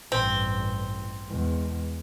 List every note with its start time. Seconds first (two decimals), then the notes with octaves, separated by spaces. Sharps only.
0.12 A1 G2 C4
1.28 E2 G#3